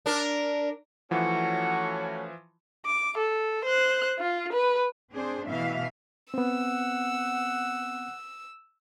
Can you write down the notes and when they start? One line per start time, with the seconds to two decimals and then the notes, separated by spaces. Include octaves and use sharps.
0.06 D4 A#4
1.11 E3 F3 A3 C#4 F#4 F#5
2.86 D6
3.18 A4
3.65 C5 F#6
4.19 F4
4.53 B4
5.13 C4 D4 G#4 C5
5.47 B2 E3 A3 E5 F5
6.34 B3 C4 F#5 E6